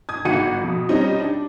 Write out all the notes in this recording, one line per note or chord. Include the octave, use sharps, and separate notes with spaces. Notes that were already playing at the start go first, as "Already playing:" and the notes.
D#6 G#6
G1 G#2 F#4 C#7 D#7
F2 B2
G3 C4 C#4 D#4
D4